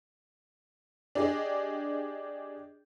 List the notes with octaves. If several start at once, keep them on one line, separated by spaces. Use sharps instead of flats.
D4 G4 G#4 D#5